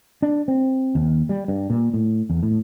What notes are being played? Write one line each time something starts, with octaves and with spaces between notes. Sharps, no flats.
D4
C4
D#2
G3
G2
A#2
A2
E2
A2